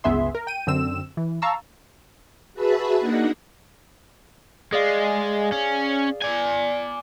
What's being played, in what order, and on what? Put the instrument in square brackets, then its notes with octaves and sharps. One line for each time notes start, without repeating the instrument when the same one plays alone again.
[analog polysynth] G1 C#2 B3 G#4 E5 C6
A#4
G5 D#7
F#2 D3 C4 E6 E7
E3
F5 A5 A#5 C#6 E6
[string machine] F#4 G#4 B4 E5 A5 B5
A#3 D4 D#4 F#5 A#6
[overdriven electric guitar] G#3 [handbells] G#4 D5 F5
[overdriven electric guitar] C#4
D5 G#5